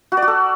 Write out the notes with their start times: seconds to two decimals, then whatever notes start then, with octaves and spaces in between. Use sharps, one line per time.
0.12 F#4
0.17 D5
0.22 F#4
0.28 A4